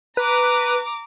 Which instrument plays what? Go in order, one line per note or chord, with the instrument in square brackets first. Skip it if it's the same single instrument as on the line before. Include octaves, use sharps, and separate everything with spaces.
[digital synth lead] B4 [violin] A#5 D6